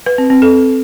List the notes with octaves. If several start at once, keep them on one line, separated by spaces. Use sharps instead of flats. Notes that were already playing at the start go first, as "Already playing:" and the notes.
B4
C4
C4
A4